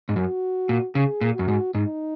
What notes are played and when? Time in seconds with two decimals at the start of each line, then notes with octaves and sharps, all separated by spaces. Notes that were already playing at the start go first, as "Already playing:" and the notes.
0.09 G#2
0.16 F#2 F#4
0.69 A#2
0.95 C#3 G#4
1.21 A#2
1.35 F#2 F#4
1.48 G#2
1.75 G#2 D#4